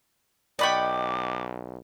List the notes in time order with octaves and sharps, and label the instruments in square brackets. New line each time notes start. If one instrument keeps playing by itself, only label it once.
[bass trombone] B1 [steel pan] D5 B5 C#6 [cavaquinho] D#5 F#5 G5 [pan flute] D6